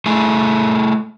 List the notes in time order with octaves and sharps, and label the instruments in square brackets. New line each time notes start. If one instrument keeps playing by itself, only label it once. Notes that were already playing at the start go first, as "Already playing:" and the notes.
[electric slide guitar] A3 E4 G#4